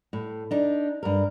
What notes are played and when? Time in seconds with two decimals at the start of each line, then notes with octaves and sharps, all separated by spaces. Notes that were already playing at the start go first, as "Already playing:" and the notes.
0.13 A2
0.51 D4 D#4
1.03 G2 A#4